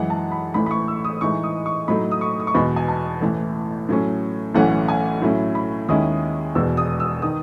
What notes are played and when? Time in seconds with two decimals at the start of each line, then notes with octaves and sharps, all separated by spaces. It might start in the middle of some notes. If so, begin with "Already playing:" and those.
Already playing: F#2 E3 G#3 F#5
0.10 A5
0.32 B5
0.54 A1 A2 E3 B5
0.66 B5
0.71 C#6
0.88 E6
1.04 D#6
1.21 A2 E3 G#3 D#4 C#6
1.43 D#6
1.66 C#6
1.88 A2 F#3 A3 D#4 B5
2.11 D#6
2.21 C#6
2.40 D#6
2.47 C#6
2.54 E2 B2 G#3 B5
2.76 G#5
2.88 A5
3.21 A1 A2 E3
3.89 A2 F#3 C#4
4.55 B1 A2 E3 A3 C#4 F#5
4.88 G#5
5.22 A2 F#3 C#4 E4
5.55 B5
5.89 D#2 D#3 G#3 C#4 E4 D#6
6.55 E1 E2 B2 E6
6.77 D#6
7.00 E6
7.22 D#3 D#6